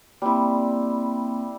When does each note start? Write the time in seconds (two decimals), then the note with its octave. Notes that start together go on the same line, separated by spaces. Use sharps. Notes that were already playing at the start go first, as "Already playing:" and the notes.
0.22 G3 A#3 C4 E4